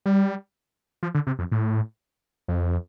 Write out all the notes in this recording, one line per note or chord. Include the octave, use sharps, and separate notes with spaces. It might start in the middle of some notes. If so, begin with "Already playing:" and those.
G3
F3
D3
C3
F2
A2
F2